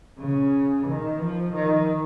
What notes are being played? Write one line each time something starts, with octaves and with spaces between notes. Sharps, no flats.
C#3
D#3
F3
D#3